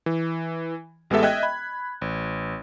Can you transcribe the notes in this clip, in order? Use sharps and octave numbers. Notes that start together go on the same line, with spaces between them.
E3
A1 G#3 B3 G4 A4 E5
D#5 E5 G5 F#6 G#6
B5
A1